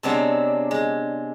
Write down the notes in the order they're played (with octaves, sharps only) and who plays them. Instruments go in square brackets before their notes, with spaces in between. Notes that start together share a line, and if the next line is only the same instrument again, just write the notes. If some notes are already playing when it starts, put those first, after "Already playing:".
[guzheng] C3 F#3 G#3 B3 C4 D4
G#3